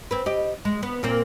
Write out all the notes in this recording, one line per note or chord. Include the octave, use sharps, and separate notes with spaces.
C4 B4
G4 D#5
G#3
B3
A#2 A#3 C4